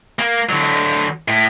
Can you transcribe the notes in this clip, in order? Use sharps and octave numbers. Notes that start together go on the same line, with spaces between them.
A#3
D3 F#3
A2